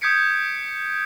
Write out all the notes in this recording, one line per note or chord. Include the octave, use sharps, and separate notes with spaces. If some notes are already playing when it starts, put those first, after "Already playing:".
D#6 G6 G#6 B6 C#7 D7